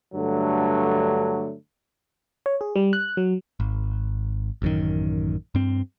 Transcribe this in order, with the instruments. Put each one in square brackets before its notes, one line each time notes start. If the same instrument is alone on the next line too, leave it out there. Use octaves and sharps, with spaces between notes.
[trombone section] G2 D3 F#3 A3
[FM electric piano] C#5
G#4
G3
F#6
F#3
[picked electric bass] G#1
A1 F#2 D#3
G2 C4